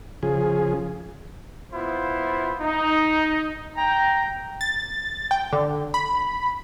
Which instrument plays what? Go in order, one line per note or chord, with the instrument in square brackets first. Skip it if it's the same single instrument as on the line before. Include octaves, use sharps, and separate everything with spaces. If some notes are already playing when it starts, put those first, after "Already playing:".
[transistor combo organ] C#3 F3 G#4
[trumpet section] B3 E4 F4 C5
D#4
G5 A#5
[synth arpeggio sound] A6
G5
D3
B5